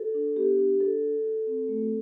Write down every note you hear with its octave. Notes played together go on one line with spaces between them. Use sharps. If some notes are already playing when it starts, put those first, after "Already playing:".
Already playing: F#4 A4
D4
B3 G4
D4
D4 A4
F#4
F#4
C4
A3